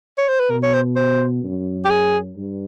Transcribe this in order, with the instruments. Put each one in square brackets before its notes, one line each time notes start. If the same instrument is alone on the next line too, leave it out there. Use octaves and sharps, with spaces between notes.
[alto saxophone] C#5
C5
B4
[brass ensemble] B2 [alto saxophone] A#4
[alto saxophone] C#5
C5
C5
[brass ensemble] F#2
[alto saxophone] G4
G#4
[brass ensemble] G2